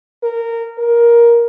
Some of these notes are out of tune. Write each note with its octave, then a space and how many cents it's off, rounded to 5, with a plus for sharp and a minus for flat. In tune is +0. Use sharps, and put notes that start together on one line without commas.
A#4 -15
A#4 +15